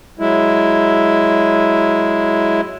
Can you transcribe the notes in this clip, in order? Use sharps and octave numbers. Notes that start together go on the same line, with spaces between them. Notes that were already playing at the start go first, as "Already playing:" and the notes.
F#3 G#3 E4